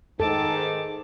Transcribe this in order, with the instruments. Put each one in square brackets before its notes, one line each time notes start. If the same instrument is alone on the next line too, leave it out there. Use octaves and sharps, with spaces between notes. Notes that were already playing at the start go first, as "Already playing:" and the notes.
[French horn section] G#2 D#3 [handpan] A4 [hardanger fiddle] A5 D6